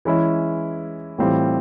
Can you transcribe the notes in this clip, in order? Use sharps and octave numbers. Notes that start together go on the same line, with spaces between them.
E3 G#3 C#4 E4
A2 E3 G3 C4 F4